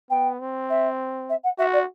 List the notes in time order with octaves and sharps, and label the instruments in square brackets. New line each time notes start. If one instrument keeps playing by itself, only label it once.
[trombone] B3 [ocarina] G5
[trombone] C4
[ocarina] E5
E5
F#5
[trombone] F#4 [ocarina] E5
[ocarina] D5